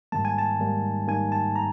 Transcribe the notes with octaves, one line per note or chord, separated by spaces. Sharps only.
G#2 D#3 G3 A#3 A5
G#5
A5
G#2 D#3 G3 A#3
G#2 D#3 G3 A#3 G#5
A5
A#5